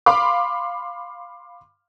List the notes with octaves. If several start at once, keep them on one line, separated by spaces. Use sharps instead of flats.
F5 B5 C6 D6